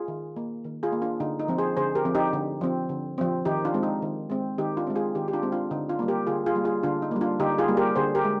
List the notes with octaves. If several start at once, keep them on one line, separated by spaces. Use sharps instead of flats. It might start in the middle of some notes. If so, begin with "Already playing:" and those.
Already playing: F4 G#4
D#3
A#3
D#3
F4 G#4
A#3
D4 F4
D3 D#4
D#4
F3 C4
G#4 C5
D3 G#4 C5
G4 A#4
F3 C4
D#4 G4
D3
F3 C4
D3
F3 C4
D#3 D#4 G4
D4 F4
G#3 C4
D#4
D#3
G#3 C4
D#3 D#4 G4
D4 F4
G#3 C4
F4 G#4
D#3 D#4 G4
G4
D4 F4
G#3 C4
D4 F4
D3 D#4
D4 F4
G3 A#3
G4 A#4
D3 F4 G#4
F4 G#4
G3 A#3
F4 G#4
D3 D4 F4
D#4
G3 A#3
D4 F4
D3 D#4 G4
F4 G#4
G3 A#3
G4 A#4
D3 G#4 C5
G4 A#4
G#3